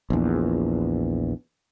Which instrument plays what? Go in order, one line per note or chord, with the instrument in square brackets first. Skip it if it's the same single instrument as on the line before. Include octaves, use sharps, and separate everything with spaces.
[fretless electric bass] A#1 E2